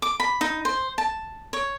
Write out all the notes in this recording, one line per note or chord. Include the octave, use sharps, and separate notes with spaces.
D6
B5
D#4
C5
A5
C#5